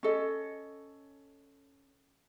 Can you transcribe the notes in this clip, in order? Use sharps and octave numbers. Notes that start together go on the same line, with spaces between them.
C#4 A4 D#5